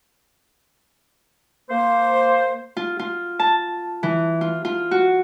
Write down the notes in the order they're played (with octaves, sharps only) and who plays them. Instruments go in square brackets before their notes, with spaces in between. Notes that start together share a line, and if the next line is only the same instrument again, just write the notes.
[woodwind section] A#3 C5
[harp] F4
F4
A5
E3
F4
F4
F#4